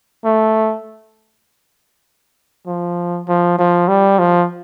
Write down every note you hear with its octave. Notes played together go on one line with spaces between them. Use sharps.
A3
F3
F3
F3
G3
F3